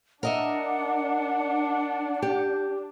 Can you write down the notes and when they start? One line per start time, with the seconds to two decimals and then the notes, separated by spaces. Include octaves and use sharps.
0.23 D4 A#4 D#5 E5 F#5
2.22 G4